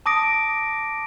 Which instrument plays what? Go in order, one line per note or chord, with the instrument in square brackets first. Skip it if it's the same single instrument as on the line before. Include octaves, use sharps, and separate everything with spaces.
[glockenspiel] A5 D6 D#6 A#6 D7